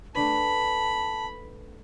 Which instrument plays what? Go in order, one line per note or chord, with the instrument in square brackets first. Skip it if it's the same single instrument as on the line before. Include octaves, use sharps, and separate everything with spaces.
[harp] A3 D4 B4 [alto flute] A5 [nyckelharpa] B5